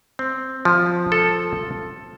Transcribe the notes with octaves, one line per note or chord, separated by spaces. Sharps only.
C4
F3
A4